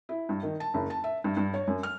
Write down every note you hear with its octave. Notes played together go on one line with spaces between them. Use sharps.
E4
G2
D#3
A5
F#1
A5
E5
G2
G2
C#5
F#2
F6